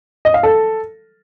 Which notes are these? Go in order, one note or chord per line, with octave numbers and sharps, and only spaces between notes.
D#5
F5
A4